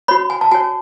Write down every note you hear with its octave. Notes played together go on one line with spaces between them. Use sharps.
F#4 C#5 B5
G#5
A5
F#4 C#5 G#5